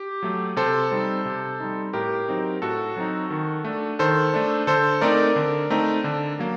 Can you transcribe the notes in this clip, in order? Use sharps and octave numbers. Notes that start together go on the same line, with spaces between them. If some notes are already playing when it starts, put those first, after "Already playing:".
Already playing: G4
F#3 A3
C3 A4 C5
G3 C4 D#4
C3
G3 C4 D#4
A2 G4 A#4
F#3 C4 D#4
A2 F#4 A4
F#3 C4 D#4
D#3
A3 D4
D#3 A4 C5
A3 D4
D3 A4 C5
A3 C4 D#4 A#4 D5
D3
A3 C4 D#4
D3
F#3 A#3